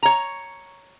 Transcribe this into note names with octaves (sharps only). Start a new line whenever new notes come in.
C#5 A#5